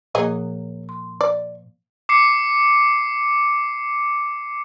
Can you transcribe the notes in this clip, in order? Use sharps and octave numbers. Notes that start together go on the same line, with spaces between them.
A#2 F3 F#3 A#3 G#4 D#5
C6
D5
D6 C7 C#7